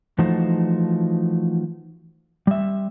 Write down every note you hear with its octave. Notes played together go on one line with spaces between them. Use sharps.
E3 F3 A3 D#4 F#4 C5
G3 E5